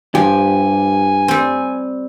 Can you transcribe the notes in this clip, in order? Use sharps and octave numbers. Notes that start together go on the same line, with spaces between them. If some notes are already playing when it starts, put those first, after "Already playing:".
G2 F3 G4 G#5
G3 C4